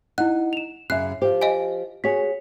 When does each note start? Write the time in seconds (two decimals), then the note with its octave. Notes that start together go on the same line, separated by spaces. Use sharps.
0.18 D#4 E4 F#5 F#6
0.53 E7 F7
0.90 F#2 C#3 E5 F#6 C7
1.22 F3 G4 C5
1.41 D#5 F5 G#5
2.04 F#4 G#4 C#5 B6